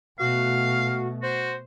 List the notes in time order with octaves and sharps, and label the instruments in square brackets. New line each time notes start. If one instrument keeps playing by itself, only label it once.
[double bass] B2 A3 [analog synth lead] F#4 [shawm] F5
[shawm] F#4 [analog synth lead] C5